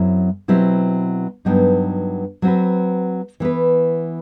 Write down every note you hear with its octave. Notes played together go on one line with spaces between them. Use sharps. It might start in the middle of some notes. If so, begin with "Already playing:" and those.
Already playing: F#2 F#3 C4 E4
B2 F#3 C4 E4 G4
G2 F#3 B3 D#4
F#3 C4 F#4 B4
E3 B3 E4 B4